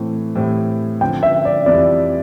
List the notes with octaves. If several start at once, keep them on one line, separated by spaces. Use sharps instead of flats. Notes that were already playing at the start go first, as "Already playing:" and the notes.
Already playing: A2 E3 A3 C4
A2 E3 G3 C4 E4
D3 F3 C4 G5
E5
D5
F2 C3 E3 G3 D5